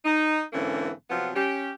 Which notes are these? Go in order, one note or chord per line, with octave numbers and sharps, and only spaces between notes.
D#4
G#2 D3 E3 A#3 C4 C#4
C3 F3 F#3 B3 C4 F4
C#4 G4